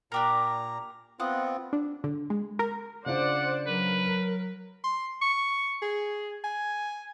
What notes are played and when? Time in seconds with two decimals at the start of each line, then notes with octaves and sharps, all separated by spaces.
0.12 A#2 D4 G4 A#4 A#5
1.20 B3 C4 F4 D#5 F#5
1.73 D4
2.04 D3
2.30 G#3
2.59 A#4
3.06 C#3 D4 F4 C5 D5 F#5
3.67 F#3 A#4 B4
4.84 C6
5.22 C#6
5.82 G#4
6.44 G#5